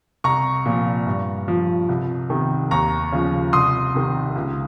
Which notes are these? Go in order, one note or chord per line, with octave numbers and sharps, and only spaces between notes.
C2 A#5 C#6
A#2 F3
G2
F3
C2
C3 D#3
D#2 A#5 C#6
C#3 F3
C2 C6 D#6
C3 D#3
C#2